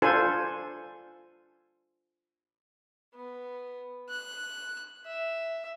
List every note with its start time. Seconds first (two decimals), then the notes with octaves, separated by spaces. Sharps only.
0.02 D4 F4 A4 C5 G#5
3.15 B3
4.09 F#6
5.06 E5